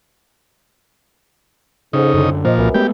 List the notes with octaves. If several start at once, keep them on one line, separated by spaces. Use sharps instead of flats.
F2 G#2 C#3 D#4
F#2 D3
A#2 F3 C5 D#5
C2 F#2 B4
G#3 A3 B3 G4